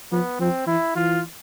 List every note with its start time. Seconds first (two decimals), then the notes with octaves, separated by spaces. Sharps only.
0.12 F3 B3
0.40 F3 C4
0.67 E3 E4
0.96 E3 F4